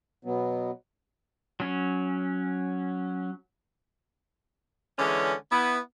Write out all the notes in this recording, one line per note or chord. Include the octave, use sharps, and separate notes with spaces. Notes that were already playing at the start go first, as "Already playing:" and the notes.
B2 F#3 B3
F#3 C#4
D3 E3 G#3 C#4
B3 E4